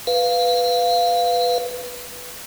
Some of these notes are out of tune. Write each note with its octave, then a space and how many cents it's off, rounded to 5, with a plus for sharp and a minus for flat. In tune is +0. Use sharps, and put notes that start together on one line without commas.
B4 +0 F5 +0